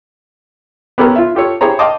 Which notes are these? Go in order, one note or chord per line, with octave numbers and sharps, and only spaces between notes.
B3 C#4 G4 A4 A#4
F4 E5
F4 G4 A4 C#5
E4 G4 G#4 C5 C#5 A#5
D#5 F5 G5 A5 D6 D#6